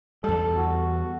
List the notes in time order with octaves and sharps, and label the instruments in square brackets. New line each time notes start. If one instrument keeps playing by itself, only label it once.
[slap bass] E2 G3 [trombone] A4
[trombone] F#4